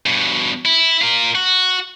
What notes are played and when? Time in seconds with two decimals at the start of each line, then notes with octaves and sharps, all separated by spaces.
0.06 G2 B2
0.65 E4
1.02 F4 A#4
1.35 F#4